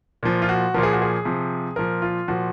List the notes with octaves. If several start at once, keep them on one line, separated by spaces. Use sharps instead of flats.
A#2 F3
F4
F#4
A#2 F3 A#4
G#4
F#4
G#4
C3 F3
A#2 F3 A#4
F4
A#2 F3 F#4